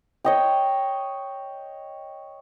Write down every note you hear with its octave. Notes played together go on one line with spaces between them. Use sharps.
C#5 D#5 G5